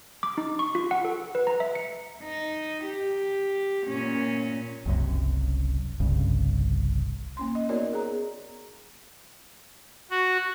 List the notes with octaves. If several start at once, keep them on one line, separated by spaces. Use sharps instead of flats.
D6
D#4
C#6
F4
F#5
A4
B4
A#5
E5
C#7
D#4
G4
A#2 C#4
F#1 C2 F#2
G1 C2 G2 C#3
A#3 C#4 C6
D#5
B3 D#4 F#4 A#4 C#5 D5
G#4 A#5
F#4